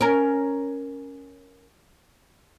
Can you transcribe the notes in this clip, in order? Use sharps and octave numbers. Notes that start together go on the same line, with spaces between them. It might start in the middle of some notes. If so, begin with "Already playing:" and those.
C#4 A#4